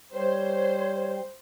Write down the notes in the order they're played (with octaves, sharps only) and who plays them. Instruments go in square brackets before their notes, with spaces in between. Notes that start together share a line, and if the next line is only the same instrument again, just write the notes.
[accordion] G3 [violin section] C5 [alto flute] C#5